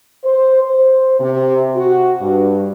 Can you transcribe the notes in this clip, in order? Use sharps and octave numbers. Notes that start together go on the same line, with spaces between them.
C5
C5
C3
F#4
G2